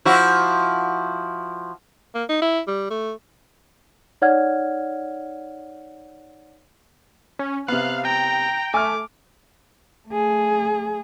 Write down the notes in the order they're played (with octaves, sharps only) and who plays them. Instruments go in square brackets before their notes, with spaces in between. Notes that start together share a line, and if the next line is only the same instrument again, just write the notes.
[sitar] F3 E4 F#4
[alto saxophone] A#3
D#4
E4
G3
A3
[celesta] D#4 C#5 D5 F#5 F6 G#6
[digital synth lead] C#4
[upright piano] C3 B3 [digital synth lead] F5 [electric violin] F#6
[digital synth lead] G5 [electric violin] A#5
[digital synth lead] A3 [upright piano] G#5 F6 [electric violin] D6
[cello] A3 G#4